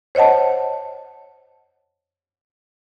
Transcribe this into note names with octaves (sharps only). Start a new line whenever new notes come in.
C5 C#5 D#5 F#5 A5